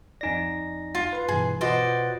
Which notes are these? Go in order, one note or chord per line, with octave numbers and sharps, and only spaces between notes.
F2 D#4 D5 G#5 A#6
F4
B4 C6
G2 B2 E3 G#4
B2 F4 F#4 B4 C5 D5 D#5 F#5